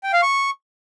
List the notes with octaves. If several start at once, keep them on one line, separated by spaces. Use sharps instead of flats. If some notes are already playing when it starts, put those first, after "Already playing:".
G5
F5
C#6